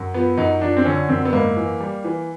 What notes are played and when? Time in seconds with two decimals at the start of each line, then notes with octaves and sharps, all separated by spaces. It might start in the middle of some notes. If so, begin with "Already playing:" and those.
Already playing: F#2
0.14 F3 B3
0.37 F#2 D#4
0.61 F3 D4
0.77 C4
0.85 D3 C#4
1.09 F#2 C4
1.25 B3
1.33 G#2 A#3
1.57 E3
1.80 G3
2.04 E3